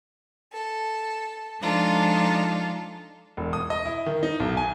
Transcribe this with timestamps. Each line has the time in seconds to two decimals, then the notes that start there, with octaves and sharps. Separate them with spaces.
0.53 A4
1.61 F3 G#3 D4 D#4 F4 A4
3.37 E1
3.53 D#6
3.70 D#5
3.85 E4
4.06 D#3
4.23 D#4
4.40 B1
4.57 G#5